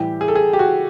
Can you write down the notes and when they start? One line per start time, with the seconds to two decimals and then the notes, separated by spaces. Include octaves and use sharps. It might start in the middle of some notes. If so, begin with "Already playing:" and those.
Already playing: A2 E3 G3 G4
0.21 G#4
0.28 A4
0.36 G#4
0.53 G4
0.59 F#4